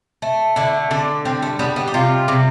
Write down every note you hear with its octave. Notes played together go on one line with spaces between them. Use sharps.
A3
D3 E4
D3 D4
G3 C4
A3
G3 B3
B3
G4
C3 F4
C3